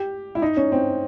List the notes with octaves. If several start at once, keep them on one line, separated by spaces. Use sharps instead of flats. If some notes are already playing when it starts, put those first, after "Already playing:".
Already playing: G4
E4
D#4
C#4
C4